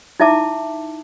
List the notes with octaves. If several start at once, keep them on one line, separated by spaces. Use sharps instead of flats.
D#4 E4 E5 A5 D6